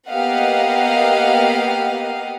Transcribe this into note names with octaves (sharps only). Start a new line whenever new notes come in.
A#3 B3 G4 D#5 F5 F#5